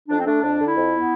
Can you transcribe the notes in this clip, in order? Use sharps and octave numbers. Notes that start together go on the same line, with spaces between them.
F2 D4
C4
A3 D4
F2 D4
D3
E4
F2
B3